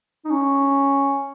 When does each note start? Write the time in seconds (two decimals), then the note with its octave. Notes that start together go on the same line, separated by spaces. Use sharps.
0.25 D#4
0.30 C#4